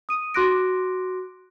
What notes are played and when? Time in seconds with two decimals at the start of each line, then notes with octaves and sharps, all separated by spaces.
0.09 D#6 D#7
0.34 F#4 C6 D6 F#6 A#6 D7